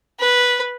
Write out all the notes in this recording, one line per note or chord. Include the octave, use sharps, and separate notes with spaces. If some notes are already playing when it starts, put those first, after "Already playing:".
B4